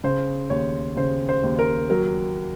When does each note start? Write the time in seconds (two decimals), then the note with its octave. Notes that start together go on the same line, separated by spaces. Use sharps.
0.04 C#3 C5
0.50 D#2 C#5
0.96 C#3 C5
1.29 C5
1.43 D#2
1.59 A#4
1.90 F#3 A#4